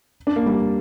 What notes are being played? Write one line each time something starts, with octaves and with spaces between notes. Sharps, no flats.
D4
A#3
G3